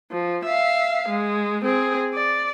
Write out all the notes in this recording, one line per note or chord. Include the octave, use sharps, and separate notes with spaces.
F3
E5 F5
G#3
C4 G#4
D5